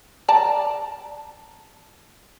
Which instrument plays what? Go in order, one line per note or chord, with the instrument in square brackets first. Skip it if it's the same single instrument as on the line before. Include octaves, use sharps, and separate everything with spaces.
[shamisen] D5 A5 A#5